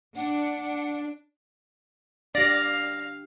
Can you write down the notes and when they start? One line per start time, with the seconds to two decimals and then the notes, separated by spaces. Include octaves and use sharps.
0.16 D4 F#5
2.35 D4 G4 D5 F5 A#6